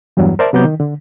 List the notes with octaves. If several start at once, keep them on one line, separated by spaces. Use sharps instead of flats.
E2 G2 F#3 G3
A#4 C5 D5 E5 A5 A#5
C3 F#3 B3 A#5 D6 G6
D#3
D3